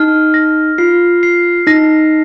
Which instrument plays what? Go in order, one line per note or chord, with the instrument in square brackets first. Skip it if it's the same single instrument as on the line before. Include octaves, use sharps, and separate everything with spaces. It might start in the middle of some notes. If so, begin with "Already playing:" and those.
Already playing: [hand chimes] D#4 [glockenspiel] F6
[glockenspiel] A#6
[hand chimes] F4 [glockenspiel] C7
[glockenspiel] C7
[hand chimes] D#4 [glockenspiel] A#6